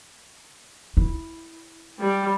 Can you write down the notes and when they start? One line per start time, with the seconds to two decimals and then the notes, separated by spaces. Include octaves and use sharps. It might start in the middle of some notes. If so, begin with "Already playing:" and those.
0.97 E4
2.00 G3